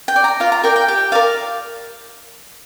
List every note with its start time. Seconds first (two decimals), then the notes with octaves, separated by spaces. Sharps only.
0.08 G5
0.16 D5
0.24 A#5
0.40 F4 F5
0.52 A#5
0.64 A#4 D5 G5
0.76 G5
0.88 G4 G5
1.12 A#4 D5 F5